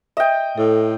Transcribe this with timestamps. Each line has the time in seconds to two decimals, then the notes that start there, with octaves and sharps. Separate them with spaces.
0.17 D#5 E5 G5
0.58 A2 A4